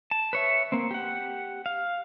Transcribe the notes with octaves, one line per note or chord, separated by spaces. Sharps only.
A5
B4 C#5 E5
A#3 C4
G4 F#5
F5